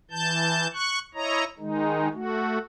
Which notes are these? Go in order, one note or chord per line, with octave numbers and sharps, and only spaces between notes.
E3 A5 G6
C#6 F#6
E4 C#5 D#5 A#5
D#3 G#3 D#4
A3 F#4